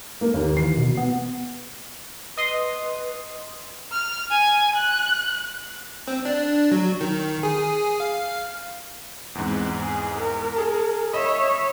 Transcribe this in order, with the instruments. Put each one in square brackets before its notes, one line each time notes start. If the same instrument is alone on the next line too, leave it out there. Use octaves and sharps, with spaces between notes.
[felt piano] A#3
D#2
[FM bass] E3 [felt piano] C7
[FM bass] B2
B3
[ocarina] B4 [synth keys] D#5 C6 D#6
[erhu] F6
G#5
F#6
[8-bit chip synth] C4
D4
F#3
D#3
G#4
F5
[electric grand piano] E2 G#2 [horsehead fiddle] C4
[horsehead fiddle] G#4
A#4
[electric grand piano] G#4 A5
[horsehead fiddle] C#5 E5 [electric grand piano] D#5 B5 D#6